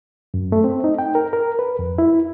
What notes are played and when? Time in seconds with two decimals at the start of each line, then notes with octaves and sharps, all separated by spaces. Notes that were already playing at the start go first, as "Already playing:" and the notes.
0.34 F#2
0.52 A3
0.64 C4
0.84 D#4
0.99 G5
1.15 A#4
1.33 A#4
1.59 B4
1.79 F2
1.98 E4